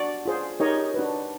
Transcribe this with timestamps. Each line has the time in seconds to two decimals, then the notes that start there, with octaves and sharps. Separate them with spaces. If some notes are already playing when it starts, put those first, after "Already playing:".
Already playing: D4 F#4 D5
0.25 F4 G#4 C5
0.60 D#4 G4 A#4 C#5 D#5
0.94 D4 F#4 B4